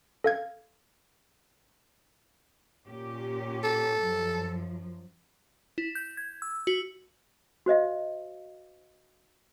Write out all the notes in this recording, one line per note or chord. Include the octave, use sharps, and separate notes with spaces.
A4 F5 G#6
A#2 C#4 G4
A4
F#2 F3
E4
G6
G#6
E6
F#4
F#4 C5 D#5 F5